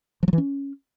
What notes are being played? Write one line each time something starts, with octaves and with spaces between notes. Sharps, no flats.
F3
F#3
E3
C#4